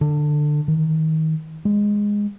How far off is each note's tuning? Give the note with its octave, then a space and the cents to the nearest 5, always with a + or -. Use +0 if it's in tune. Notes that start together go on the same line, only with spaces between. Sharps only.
D3 +20
D#3 +30
G#3 -10